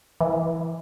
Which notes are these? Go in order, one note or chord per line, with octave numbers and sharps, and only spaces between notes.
E3